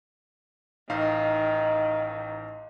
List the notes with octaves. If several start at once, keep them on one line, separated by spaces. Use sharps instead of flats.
A1 D#3 D#4 F5